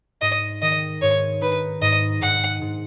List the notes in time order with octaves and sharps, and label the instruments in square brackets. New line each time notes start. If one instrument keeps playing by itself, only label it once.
[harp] G#2 [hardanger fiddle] D#5
[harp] D#3 [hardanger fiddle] D#5
[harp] G#2 [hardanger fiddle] C#5
[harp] D#4 [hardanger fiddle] B4
[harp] G#2 [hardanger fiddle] D#5
[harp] G#2 [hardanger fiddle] F#5
[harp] G#2